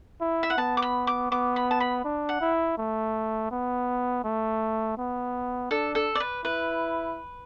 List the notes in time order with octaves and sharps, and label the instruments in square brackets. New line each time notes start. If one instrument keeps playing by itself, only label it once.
[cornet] E4
[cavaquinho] E5
F#5
[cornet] B3 [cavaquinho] A5
[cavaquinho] D6
B5
D6
[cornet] B3 [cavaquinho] D6
[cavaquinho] B5
A5
B5
[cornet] D4
[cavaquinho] F#5
[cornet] E4
A3
B3
A3
B3
[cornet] D4 [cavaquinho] A4
[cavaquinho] A4
D5
B4
[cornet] E4 [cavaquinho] B4